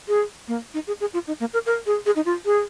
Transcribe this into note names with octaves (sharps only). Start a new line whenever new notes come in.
G#4
A#3
D#4
G#4
G#4
F4
D#4
A#3
A#4
A#4
G#4
G#4
D#4
F4
G#4